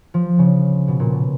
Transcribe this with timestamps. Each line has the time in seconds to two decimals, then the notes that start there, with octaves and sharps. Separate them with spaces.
0.14 F3
0.39 C#3
0.88 B2
1.00 A#2
1.12 B2